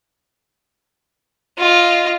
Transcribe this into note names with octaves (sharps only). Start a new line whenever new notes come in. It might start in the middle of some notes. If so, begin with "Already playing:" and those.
F4 D#5